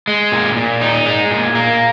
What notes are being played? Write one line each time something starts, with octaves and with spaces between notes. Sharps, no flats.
G#3
A#2
A#2
D#4
G#3
A#2
A#3